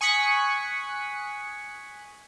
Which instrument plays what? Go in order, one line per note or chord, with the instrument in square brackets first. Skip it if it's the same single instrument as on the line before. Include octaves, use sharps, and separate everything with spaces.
[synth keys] G#5 C#6 D#6 F#6 B6 C#7